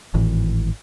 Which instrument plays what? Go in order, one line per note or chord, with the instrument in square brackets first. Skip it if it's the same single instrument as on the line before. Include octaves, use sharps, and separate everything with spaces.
[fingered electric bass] G#1 A2 E3